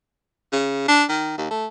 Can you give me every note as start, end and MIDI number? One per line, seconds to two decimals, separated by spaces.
0.52 0.87 49
0.88 1.04 62
1.09 1.34 51
1.38 1.48 39
1.51 1.66 57